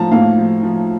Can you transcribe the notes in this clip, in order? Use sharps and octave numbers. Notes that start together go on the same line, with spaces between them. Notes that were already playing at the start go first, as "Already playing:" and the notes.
Already playing: A2 F3 A5 A#5
A2 F5
F3
F3